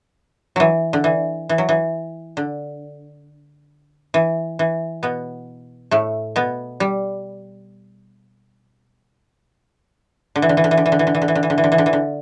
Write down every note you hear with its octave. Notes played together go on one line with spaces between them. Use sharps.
E3 F#3
D3
E3
E3
F#3
E3
D3
E3
E3
B2 B3
A2 A3
B2 B3
G3
D3
E3
D3
E3
D3
E3
D3
E3
D3
E3
D3
E3
D3
E3
D3
E3
D3
E3
D3
E3
D3
E3
D3